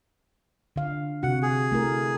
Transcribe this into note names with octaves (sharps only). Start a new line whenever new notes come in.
D3 F5
C3 F#4 F#5
G#4
A3 E4 A#4